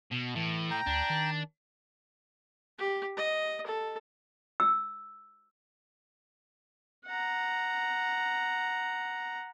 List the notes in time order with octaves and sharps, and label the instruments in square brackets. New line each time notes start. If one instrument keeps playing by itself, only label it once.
[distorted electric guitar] B2
[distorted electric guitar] A2 [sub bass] E3
[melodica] G5 A#5
[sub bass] D2 [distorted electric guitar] D4
[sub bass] D#3
[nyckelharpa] G4
D#5
A4
[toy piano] E6
[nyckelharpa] F#5 A#5